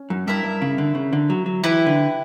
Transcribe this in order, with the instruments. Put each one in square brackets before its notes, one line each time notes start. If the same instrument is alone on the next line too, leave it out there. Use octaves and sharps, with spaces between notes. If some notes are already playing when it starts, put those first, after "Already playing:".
Already playing: [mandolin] C#4
[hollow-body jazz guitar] F#2
[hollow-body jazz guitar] G2 [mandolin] E4 A#4 E5
[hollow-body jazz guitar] G2
C#3
D3
C#3
D3
F#3
F#3
[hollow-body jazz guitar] E3 [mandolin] E4 G4 B4
[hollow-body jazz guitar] D3